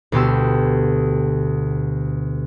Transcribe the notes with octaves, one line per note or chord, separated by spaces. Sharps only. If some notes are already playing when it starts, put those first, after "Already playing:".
D2 B2 B3 G4 C6 E6